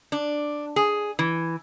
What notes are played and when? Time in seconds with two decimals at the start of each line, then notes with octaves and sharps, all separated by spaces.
0.12 D4
0.76 G#4
1.19 E3